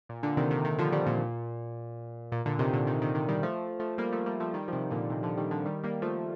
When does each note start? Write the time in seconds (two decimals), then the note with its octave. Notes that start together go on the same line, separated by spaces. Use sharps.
0.09 A#2
0.23 A#2 D3
0.37 C3 D#3
0.51 C3 D#3
0.65 C3 D#3
0.78 D3 F3
0.92 D#3 G3
1.06 A#2
2.32 A#2
2.46 A#2 D3
2.59 C3 D#3
2.73 A#2 D3
2.87 C3 D#3
3.02 C3 D#3
3.15 C3 D#3
3.28 D#3 G3
3.43 F3 A3
3.80 F3 A3
3.98 G3 A#3
4.12 F3 A3
4.26 G3 A#3
4.40 F3 A3
4.54 D#3 G3
4.68 F3
4.72 C3 D#3
4.91 A#2 D3
5.10 C3 D#3
5.23 D3 F3
5.37 D#3 G3
5.51 D3 F3
5.66 D#3 G3
5.83 G3 A#3
6.02 F3 A3